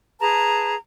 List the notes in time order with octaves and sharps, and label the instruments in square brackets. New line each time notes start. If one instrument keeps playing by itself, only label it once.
[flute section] G#4 B4 A5 A#5